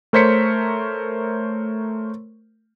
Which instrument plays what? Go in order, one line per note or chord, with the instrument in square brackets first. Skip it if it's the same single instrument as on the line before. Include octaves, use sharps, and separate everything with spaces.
[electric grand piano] A3 A#4 C5 C#5 B6 C#7